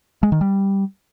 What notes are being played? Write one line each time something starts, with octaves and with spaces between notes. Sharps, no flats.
G#3
D#3
G3